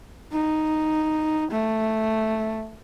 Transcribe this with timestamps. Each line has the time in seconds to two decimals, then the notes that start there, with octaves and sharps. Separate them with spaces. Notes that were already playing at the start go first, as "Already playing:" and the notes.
0.32 D#4
1.51 A3